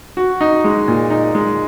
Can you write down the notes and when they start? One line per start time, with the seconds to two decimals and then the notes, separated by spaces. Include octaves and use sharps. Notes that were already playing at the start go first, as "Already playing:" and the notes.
0.17 F#4
0.41 D#4
0.64 G#3
0.88 A#2
1.10 D#4
1.35 G#3